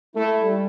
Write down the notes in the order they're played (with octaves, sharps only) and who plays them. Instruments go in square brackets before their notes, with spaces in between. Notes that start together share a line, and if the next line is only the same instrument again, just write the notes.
[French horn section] A3 [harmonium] E4
[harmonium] G3